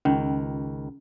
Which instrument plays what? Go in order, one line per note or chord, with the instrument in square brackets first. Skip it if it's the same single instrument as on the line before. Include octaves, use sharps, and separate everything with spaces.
[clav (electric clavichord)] C#2 D#3 [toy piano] C#4